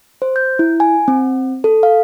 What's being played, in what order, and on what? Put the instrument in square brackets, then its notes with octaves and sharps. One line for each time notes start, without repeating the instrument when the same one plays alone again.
[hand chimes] C5
G6
E4
G#5
C4
A4
F5